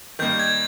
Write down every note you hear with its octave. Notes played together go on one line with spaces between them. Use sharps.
D#3 G3 A#3 D#4 G6
G#6